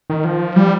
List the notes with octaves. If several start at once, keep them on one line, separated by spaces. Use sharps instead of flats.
D#3
F3
G3